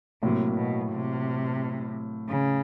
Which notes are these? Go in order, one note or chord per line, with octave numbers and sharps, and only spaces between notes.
A2 C3 F#3 A#3
B2
C3
C#3